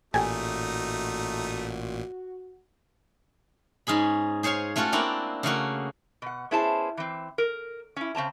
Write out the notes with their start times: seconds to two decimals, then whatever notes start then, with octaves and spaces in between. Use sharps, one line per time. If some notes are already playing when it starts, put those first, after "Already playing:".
0.14 A1 A#2 A3 D#4 F#4 G4 A4 G#5
3.87 G#2 C#4 G#4 B5
4.43 G#4 C5 C#5 F5 G#5
4.76 A3 C#4 F4 F#4 A4
4.92 A#3 C4 D4 E4 D5 A#5
5.43 C#3 A3 A#3 F#4
6.22 B2 F#5
6.51 B3 C#4 E4 G#4 C5 A5
6.97 E3 C4
7.38 A#4
7.96 C#4 E4
8.15 C#3 C4 A5 A#5